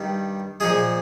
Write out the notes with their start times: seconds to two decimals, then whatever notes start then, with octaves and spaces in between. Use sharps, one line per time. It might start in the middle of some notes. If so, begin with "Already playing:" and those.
Already playing: G2 D#3 G3
0.60 A#2 F3 G#3 G#4